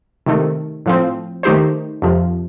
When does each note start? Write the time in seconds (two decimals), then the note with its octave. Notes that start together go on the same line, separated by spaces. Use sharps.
0.26 C3 D#3 A3
0.86 A2 F3 C4
1.43 D#3 A3 D#4 G4 C5
2.02 F2 C3 F3